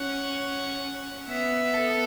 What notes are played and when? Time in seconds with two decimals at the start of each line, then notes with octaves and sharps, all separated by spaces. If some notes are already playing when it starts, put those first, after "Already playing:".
Already playing: C#4 F#5
1.28 B3 E5
1.74 A4